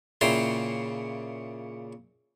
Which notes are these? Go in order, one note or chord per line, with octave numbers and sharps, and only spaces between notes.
A#2 C#3 E4 G5 A#5 C6